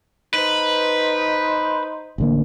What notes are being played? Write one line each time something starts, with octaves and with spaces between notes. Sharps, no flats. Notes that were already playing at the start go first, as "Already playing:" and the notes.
D#4 B4 C5
A1 D3 A#3